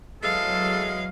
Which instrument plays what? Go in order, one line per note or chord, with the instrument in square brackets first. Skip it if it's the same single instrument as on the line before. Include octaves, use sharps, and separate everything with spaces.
[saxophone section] E2 E3 G#3 [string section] F#3 [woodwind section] G#4 A4 [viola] F5